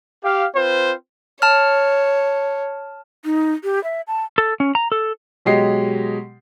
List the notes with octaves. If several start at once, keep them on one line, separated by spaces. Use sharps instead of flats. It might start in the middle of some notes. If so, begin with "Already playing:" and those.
G4 F5
C4 F4 B4 C5
C#5 A5 F6
D#4
G4
E5
A5
A4
C#4
A#5
A4
B2 F#3 G#3 G4 D#5 C7